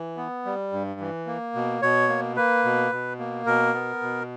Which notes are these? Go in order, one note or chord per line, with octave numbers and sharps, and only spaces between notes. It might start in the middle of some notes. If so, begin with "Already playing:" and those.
Already playing: E3
B3
G3
G2
E3
A#3
B2
B2 C#5
A#3
A#3 B4
B2
B2
A#3
B2 A#4
B3
B2